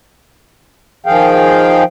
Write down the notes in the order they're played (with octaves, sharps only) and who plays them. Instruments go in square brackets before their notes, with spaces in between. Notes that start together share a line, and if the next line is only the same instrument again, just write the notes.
[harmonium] D#3 F3 G#4 F5 G5